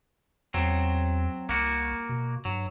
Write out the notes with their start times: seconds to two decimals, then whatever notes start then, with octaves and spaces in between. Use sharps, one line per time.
0.54 E2 F#3 C4
1.49 C2 A#3 F#4
2.09 B2
2.45 G2 F#3